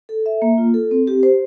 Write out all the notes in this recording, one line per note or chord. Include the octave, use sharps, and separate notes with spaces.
A4
E5
A#3
F4
A4
C4
G4
C5